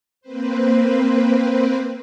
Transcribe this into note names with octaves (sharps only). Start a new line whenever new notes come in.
A#3 C4 B4 C5